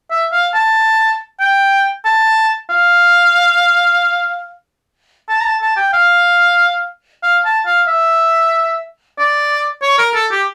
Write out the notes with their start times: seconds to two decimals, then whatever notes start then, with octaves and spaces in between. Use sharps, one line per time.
0.11 E5
0.32 F5
0.54 A5
1.40 G5
2.05 A5
2.70 F5
5.29 A5
5.41 A#5
5.45 A5
5.62 A5
5.77 G5
5.93 F5
7.23 F5
7.45 A5
7.66 F5
7.87 E5
9.18 D5
9.82 C#5
9.98 A#4
10.15 A4
10.31 G4